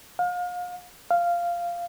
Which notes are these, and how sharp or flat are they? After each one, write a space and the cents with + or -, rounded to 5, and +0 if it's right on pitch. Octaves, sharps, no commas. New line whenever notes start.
F5 +35
F5 -10